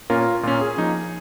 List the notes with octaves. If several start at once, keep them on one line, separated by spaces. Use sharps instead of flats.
A#2 A#3 C#4 F4 A#4
A#2 A#3 C#4 F4
G#4
F3 A#3 D#4